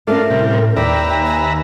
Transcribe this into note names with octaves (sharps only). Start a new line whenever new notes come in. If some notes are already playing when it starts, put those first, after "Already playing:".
A3 C#4 D4 F4 A#4
A2 C3 G3
D#2 B4 D5 E5 G5 A#5
G#5